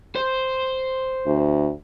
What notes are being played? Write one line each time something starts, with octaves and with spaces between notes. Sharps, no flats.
C5
D2